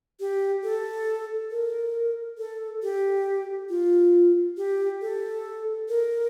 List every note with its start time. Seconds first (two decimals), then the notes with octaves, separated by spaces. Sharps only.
0.20 G4
0.64 A4
1.51 A#4
2.38 A4
2.83 G4
3.70 F4
4.57 G4
5.02 A4
5.89 A#4